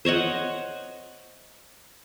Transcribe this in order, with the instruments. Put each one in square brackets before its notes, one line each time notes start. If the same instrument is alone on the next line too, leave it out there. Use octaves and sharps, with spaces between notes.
[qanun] C5 C#5 D#5 F#5